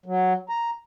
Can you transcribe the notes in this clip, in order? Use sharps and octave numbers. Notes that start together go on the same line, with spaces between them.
F#3
A#5